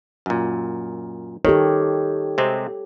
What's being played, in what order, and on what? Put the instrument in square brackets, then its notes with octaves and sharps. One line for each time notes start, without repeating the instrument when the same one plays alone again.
[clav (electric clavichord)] F#2 A#2
[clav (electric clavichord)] D#3 [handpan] G4 A4 C#5
[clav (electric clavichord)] C3 G#3 C4